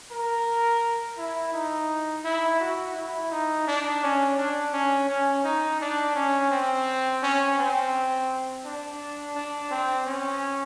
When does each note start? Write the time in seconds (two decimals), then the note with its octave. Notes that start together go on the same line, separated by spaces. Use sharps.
0.11 A#4
1.17 E4
1.53 D#4
2.24 E4
2.60 F#4
2.96 E4
3.31 D#4
3.67 D4
4.03 C#4
4.37 D4
4.73 C#4
5.09 C#4
5.44 D#4
5.81 D4
6.15 C#4
6.51 C4
7.23 C#4
7.58 C4
8.65 D4
9.36 D4
9.71 C4
10.06 C#4